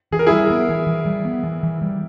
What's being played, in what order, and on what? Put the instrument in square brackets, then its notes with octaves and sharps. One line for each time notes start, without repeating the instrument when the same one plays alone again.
[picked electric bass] E3 [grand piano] G#4
[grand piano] A#4
[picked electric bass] G3 [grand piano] E4 G#4
[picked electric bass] B3
E3
E3
G3
B3
E3
E3
G3